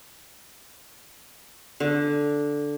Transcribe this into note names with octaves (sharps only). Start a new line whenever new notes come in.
D3